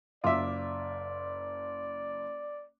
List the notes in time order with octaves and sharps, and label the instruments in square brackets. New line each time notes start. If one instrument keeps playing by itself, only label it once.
[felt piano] F#1 D6 [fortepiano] F4 E5 [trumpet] D5